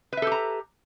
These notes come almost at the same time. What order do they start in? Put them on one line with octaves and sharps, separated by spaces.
B4 E5 A4 G4 A#5